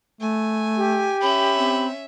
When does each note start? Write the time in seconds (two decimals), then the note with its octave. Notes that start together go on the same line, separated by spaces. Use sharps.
0.21 A3 G#5
0.77 G4
1.22 C#4 E5 B5
1.59 C4